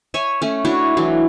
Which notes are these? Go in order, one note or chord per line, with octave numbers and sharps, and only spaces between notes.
C#5 E5 G#5
A3 C#4
D4 E4 F#4 C#5
E3 F#3